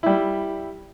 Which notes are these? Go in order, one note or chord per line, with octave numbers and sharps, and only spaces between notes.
G3 E4